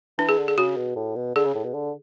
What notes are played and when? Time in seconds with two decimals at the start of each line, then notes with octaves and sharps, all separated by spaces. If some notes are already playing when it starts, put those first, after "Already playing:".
0.18 E3 D4
0.29 G#4
0.38 D3
0.48 G#4
0.57 C#3 F#4
0.77 B2
0.96 A2
1.16 B2
1.35 D3 G#4
1.45 C#3
1.55 A2
1.64 B2
1.74 D3